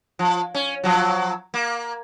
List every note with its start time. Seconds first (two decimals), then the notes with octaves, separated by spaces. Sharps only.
0.19 F3
0.55 C#4
0.84 F3 F#3
1.54 A#3